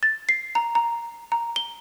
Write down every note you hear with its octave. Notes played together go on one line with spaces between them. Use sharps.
A6
C7
A#5
A#5
A#5
G7